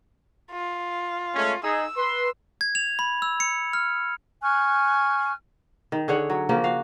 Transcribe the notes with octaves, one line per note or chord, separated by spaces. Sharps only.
F4
G#3 A3 C#4
D#4 G#4 E6
B4 C6
G#6
F7
B5
E6
C#7
F6
G#5 C#6 F6 F#6
D#3
D3 G#4 C#5 F#5
F#3
C#3 F3 A#3 C#4
F#4 F5